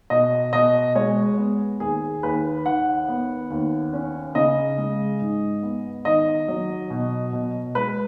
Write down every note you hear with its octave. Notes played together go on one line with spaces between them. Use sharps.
B2 D#5
B2 D#5
G#3 C#5
B3
D#2 G#4
D#2 B4
D#3 F#5
B3
D#2
C#4
C#3 D#5
G#3
G#2
B3
D#3 D#5
F#3
B2
B2
G#3 B4